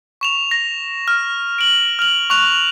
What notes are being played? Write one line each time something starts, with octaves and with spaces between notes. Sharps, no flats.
C#6 E7 F7
A#6
F6
D7 F#7
F6 F7 F#7
C#6 F#6 F7